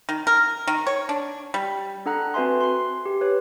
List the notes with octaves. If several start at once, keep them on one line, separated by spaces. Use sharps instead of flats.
D#3
A#4
D#3
C#5
D4
G3
D4 A4 F#5 A#5 F#6
C4 F#4 B4 E5 G#5 C6
C6 C7
G4
B4 C#5